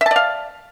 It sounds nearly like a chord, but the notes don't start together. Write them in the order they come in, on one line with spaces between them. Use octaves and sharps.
E5 A5 D5 F5